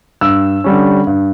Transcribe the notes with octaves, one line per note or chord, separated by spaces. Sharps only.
G2 E6
D3 G3 C#4
G2